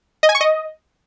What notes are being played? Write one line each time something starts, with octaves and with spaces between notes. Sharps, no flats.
D#5
G#5
C#6
D#5